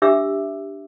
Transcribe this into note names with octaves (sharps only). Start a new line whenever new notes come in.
D4 G4 E5 D6 E6